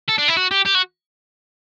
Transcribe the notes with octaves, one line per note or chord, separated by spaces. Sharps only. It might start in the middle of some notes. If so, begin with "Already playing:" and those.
A4
D4
E4
F#4
G4
G4
F#4